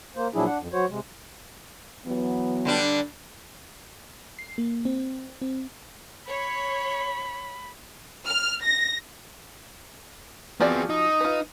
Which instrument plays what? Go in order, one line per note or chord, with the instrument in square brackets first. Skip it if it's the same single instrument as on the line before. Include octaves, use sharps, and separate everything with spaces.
[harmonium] A#3 C5
A#2 F3 F#3 D4 E4 G#4
D4 F#5
F2
F#3 F#4 C5 C#5
C3 G#3
[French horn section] E3 F#3 B3
[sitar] D3 G3 D4
[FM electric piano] C7
A#3
C4
C4
[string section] C#5 [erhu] B5
[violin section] F6
A#6
[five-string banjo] F3 F#4 D5 [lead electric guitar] B3 G#4 [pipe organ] C4
[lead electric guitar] D#4 [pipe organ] D#6
[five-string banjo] F4 B4